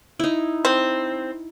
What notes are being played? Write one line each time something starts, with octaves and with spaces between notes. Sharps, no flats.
D#4 E4
C4